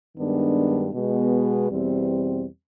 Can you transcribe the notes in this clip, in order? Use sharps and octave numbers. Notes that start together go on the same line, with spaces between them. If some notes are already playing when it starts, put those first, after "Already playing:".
G2 D#3 G#3 B3 D4
B2 G#3 B3
E2 B2 G3 C4